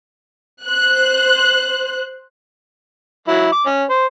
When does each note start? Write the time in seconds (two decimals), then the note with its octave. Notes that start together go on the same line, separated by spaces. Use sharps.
0.64 C5 F#6
3.28 F#3 E4
3.52 D6
3.66 C#4
3.90 C5